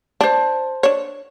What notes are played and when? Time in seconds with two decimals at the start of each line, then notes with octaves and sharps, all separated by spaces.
0.21 D4 C5 A5
0.83 D4 C#5